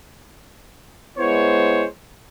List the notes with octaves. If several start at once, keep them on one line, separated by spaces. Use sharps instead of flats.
G#3 B3 E4 C5 C#5